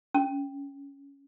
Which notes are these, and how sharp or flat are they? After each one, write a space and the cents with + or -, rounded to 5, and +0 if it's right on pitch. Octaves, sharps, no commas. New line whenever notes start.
C#4 +10